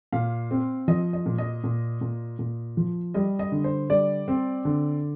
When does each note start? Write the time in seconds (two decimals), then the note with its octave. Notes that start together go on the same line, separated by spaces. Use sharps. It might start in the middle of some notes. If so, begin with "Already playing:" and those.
0.12 A#2 F5
0.51 C4
0.88 F3 D#5
1.13 D#5
1.26 A#2
1.38 D#5
1.64 A#2
2.01 A#2
2.39 A#2
2.77 F3
3.14 G3 D#5
3.39 D#5
3.52 D3
3.64 C5
3.89 G3 D5
4.28 C4
4.65 D3